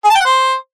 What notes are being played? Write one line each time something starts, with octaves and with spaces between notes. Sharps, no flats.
G#4
A5
G5
F#5
C5